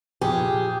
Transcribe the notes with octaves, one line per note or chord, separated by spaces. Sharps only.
A#1 G4 G#4